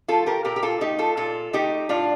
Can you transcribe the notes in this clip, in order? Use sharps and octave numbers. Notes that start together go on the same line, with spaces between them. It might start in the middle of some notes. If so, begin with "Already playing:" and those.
F3 A3 F4 A4
G4 A#4
A#2 G4 A#4
G4
F4 A4
A3 D#4 G4
F4 A4
A#2 F4 A4
A3 D#4 G4
A2 D4 F4